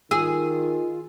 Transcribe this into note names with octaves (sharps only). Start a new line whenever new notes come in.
D#3 F4 G#4 E6